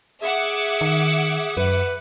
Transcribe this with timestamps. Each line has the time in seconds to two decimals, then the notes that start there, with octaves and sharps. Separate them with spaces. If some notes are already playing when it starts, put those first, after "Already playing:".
0.22 G#4 E5 F#5 D6
0.81 D#3
1.57 F#2 B4